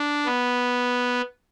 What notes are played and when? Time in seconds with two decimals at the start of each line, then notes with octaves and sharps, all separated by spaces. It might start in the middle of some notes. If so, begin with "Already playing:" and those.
Already playing: D4
0.26 B3